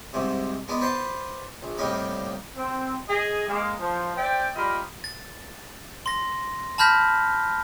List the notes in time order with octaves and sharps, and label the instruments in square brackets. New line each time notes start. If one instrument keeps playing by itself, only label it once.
[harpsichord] C2 G#2 C3
G#3 B3 D4
B4 C5 D5 F#5 A5
A#1
C2 A2 G3 A#3 D#4
[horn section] C4
G#4 D#5
G#3 A#3
F3
C5 D5 E5 G5
G3 F4 G4 A#4 D#5 B5
[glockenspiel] A6
C6 A#6
A5 B5 F6 G6 A#6 B6